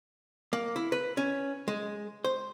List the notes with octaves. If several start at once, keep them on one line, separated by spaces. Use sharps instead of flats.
A#3
E4
B4
C#4
G#3
C5